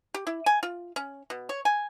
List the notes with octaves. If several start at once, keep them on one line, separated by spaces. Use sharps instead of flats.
G4
E4
G#5
F4
C#4
B2
C#5
G#5